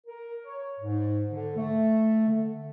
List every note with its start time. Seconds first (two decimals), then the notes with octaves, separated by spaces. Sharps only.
0.07 A#4
0.45 C#5
0.80 G#2
1.30 D3
1.56 A3
2.28 D3